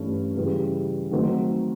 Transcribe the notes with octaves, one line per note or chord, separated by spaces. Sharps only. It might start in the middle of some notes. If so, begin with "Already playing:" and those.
Already playing: G2 E3 A3 C#4 E4
C#3 E3 G3
D#3 F#3 A3 C4 D#4